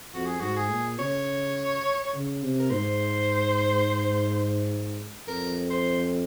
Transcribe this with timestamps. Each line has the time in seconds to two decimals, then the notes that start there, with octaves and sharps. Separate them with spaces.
0.14 F2 F#4
0.26 G#4
0.41 G#2 F#4
0.57 G#4
0.71 A#2
0.99 C#3 C#5
2.14 C#3
2.43 C3
2.60 A#4
2.70 G#2 C5
5.28 F2 A#4
5.70 C5